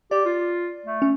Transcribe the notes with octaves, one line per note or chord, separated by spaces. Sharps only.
G4 D5
F4
A3
C#4